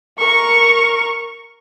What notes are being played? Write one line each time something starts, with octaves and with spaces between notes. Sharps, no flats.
A#4 C#6